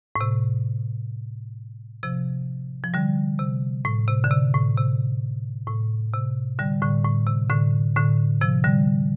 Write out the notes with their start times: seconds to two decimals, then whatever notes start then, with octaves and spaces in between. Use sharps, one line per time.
0.16 A2
0.21 C3
2.03 C3 F3
2.84 F3
2.94 D3 G3
3.39 C3
3.85 A2
4.08 C3
4.24 D3
4.30 C3
4.54 A2
4.77 C3
5.67 A2
6.13 C3
6.59 D3 G3
6.82 A2 D3
7.05 A2
7.27 C3
7.50 A2 D3
7.96 A2 D3
8.41 C3 F3
8.64 D3 G3